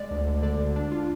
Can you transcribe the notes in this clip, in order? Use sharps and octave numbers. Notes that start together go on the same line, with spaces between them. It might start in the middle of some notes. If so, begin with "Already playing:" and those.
Already playing: G#3 D5
D2
D2
D3 D5
D2
D4
F4